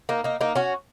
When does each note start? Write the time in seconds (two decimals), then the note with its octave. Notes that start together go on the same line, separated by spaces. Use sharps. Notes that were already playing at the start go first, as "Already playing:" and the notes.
0.09 A#3 D#4
0.24 A#3 D#4
0.41 A#3 D#4
0.56 C#4 F#4